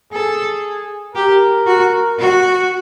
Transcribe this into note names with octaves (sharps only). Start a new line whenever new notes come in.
G#4 A4
G4 A#4
F#4
F#4